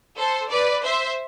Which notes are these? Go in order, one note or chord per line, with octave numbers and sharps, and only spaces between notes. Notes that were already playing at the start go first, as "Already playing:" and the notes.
A4 C5
B4 D5
C5 E5